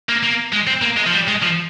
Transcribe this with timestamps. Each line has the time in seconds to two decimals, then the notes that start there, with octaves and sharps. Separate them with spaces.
0.09 A#3
0.23 A#3
0.52 G#3
0.67 C4
0.82 A#3
0.97 G#3
1.06 F3
1.13 G3
1.27 G#3
1.42 F3